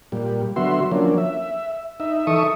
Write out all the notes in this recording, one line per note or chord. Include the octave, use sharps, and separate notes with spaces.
A#2 G3
D3 F#3 B3 F#4 E5 C6
F3 F#3 A#3 C#4 D4
E5
D#4 E5
E3 D#4 A4 E5 C#6 D#6